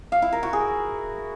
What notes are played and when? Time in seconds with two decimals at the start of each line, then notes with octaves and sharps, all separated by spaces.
0.12 F5
0.22 E4
0.32 A#4
0.43 F#4
0.53 G#4